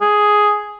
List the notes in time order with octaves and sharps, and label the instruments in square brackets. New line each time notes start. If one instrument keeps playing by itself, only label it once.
[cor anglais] G#4